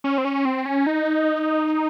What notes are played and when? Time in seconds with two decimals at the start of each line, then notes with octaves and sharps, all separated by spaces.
0.04 C#4
0.18 C4
0.25 C#4
0.45 C4
0.66 C#4
0.87 D#4